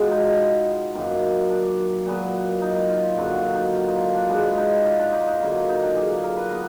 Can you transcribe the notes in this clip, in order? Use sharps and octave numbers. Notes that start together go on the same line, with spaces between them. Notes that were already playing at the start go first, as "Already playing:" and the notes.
Already playing: B2 G#3 B3 F4
D#4
F#2 D#3 A#3
D4
A#2 F#3 B3
D#4
F4
F#2 D3 F#3 A#3 F#4
F#4
D#4
F4
D#4
D4
D4
B2 G#3 B3 D4
D#4
F4
D4
D#4
D#4
D3 F#3 A#3 F4
F4
D#4
D4
G#4
A#4
B4
B3 A#4